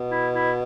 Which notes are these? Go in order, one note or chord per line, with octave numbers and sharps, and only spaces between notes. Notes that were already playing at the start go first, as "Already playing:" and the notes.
Already playing: B2
E4
E4